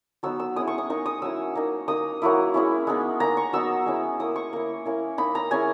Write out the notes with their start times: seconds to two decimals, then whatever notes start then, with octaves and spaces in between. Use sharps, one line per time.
0.23 F#3 B3 D#4 E6
0.40 E6
0.56 G#3 C#4 E4 D#6
0.68 C#6
0.78 D#6
0.90 A#3 D#4 C#6
1.06 D#6
1.22 F#3 C#4 E4 E6
1.55 A#3 D#4
1.88 A#3 D#4 D#6
2.22 F#3 A#3 E4
2.54 G#3 C#4 E4
2.87 G#3 B3 D#4
3.20 A#3 D#4 A#5
3.37 C#6
3.53 F#3 B3 D#4 E6
3.86 G#3 C#4 E4
4.19 A#3 E4 D#6
4.36 C#6
4.53 A#3 E4
4.86 A#3 C#4 E4
5.18 A#3 D#4 B5
5.35 A#5
5.51 G#3 C#4 E4 G#5